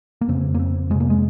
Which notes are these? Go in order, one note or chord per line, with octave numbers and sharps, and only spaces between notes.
A#3
F2 C#3 C4
A#3
C4
F2 C3 G#3
A#3
G#3